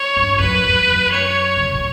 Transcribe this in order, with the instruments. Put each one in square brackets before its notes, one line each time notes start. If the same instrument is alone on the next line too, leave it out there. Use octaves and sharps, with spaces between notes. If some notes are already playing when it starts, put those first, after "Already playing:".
Already playing: [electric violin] C#5
[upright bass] G2
E2
[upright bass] F#2 [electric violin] B4
[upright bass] E2
F#2
[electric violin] C#5
[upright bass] C#3
B2
A2